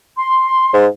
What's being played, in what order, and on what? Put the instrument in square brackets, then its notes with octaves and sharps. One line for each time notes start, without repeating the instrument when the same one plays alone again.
[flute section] C6
[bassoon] G#2